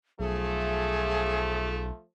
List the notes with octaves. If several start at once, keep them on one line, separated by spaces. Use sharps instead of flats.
B1 F3 A3 G#4